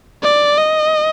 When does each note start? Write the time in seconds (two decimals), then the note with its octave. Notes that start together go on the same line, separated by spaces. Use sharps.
0.23 D5
0.57 D#5